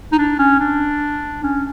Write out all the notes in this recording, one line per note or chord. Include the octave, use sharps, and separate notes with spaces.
D#4
D4
C#4
D4
C#4